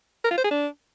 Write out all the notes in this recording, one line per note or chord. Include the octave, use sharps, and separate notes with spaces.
A#4
F4
C5
G#4
D4